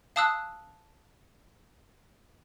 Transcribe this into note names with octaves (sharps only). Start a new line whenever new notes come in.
F5 A5 D#6 E6 F#6